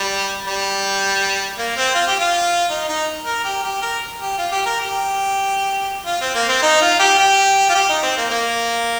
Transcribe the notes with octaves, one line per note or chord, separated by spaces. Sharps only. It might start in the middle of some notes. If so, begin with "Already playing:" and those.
Already playing: G3
G3
A#3
C4
F4
G4
F4
D#4
D#4
A#4
G4
G4
A#4
G4
F4
G4
A#4
G4
F4
C4
A#3
C4
D#4
F4
G4
G4
F4
G4
D#4
C4
A#3
A#3